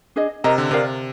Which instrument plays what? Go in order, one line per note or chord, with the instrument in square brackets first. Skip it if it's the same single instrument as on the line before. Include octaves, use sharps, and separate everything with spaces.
[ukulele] D4 G#4 D#5
[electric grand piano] C3 [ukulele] A#4 D#5 A#5
[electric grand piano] D3
[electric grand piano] C3 [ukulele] A#4 D5 F5